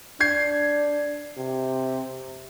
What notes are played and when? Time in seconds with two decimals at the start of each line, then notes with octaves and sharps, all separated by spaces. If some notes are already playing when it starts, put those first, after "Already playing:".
0.20 D4 G6 G#6 C7
1.37 C3